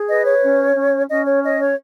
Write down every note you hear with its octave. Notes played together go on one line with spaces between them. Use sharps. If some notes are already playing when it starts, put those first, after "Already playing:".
Already playing: G#4
B4 D#5
C#5
C#4
C#4
C#4 D#5
C#5
C#5 D#5
C#5